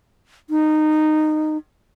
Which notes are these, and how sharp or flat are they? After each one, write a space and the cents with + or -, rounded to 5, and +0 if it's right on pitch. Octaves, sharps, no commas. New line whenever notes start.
D#4 -15